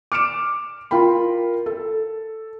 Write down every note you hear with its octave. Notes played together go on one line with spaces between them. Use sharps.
D6 F6 C#7 D7 E7
F4 A#4 G5 B5
A4